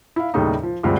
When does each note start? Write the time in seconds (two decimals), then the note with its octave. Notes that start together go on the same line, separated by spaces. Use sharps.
0.16 E4 F5
0.34 D#2 A2 C#3 G3 A3 D#4
0.63 F3
0.83 D2 G2 D3 F3 G#3 C4